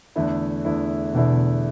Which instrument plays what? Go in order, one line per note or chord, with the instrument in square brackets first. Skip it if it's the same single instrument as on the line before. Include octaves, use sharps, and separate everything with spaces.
[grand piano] E2 D3 A3 E4
E2 D3 A3 E4
[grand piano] E2 D3 A3 E4 [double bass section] B2